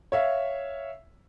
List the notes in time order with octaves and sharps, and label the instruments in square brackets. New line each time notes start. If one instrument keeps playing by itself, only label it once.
[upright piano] C#5 E5 F5